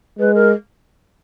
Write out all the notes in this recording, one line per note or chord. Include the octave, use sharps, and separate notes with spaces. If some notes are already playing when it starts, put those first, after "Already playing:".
G#3 B4
A#4